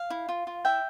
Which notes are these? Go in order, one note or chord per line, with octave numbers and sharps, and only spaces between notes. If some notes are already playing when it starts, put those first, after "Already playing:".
Already playing: F5
E4
F4
F4
E4 E5 G5